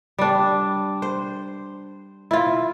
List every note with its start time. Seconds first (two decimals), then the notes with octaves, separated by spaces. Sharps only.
0.19 G3 D4
1.02 C5
2.31 E4 F4